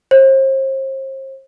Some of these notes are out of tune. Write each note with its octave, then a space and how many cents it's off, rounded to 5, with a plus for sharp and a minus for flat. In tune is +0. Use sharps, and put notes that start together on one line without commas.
C5 +40